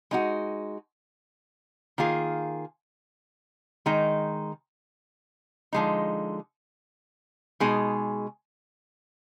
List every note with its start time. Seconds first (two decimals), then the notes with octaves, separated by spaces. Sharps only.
0.11 G#3 D#4 F#4
1.98 D#3 A#3 F4 G#4
3.86 D#3 G#3 D#4
5.73 D3 F3 G#3 D#4
7.60 B2 G#3 D#4 G#4